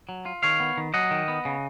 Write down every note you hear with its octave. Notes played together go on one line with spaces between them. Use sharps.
F#3
F4
D#3 C#5 F5
B3
D#3
F#3 D#5 F#5
D#3
B3
C#3